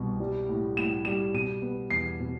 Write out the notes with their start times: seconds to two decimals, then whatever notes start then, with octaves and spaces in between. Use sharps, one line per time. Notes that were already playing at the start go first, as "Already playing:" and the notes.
Already playing: C2 B2
0.20 G3
0.49 A2
0.77 A2 E7
1.05 G3 E7
1.34 B2 D#7
1.62 B3
1.90 E2 C7
2.20 B2